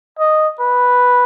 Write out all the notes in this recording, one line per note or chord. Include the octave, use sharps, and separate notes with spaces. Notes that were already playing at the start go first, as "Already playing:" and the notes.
D#5
B4